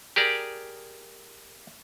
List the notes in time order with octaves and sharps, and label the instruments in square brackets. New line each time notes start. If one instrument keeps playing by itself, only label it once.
[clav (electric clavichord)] G4 G#4 A#4 D5